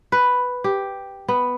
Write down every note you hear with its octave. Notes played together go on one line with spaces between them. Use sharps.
B4
G4
B3